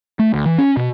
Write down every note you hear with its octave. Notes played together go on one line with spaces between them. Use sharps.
A3
D2
E3
C#4
B2